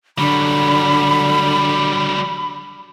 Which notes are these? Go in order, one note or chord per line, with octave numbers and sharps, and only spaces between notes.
D3 F#3 G3 B5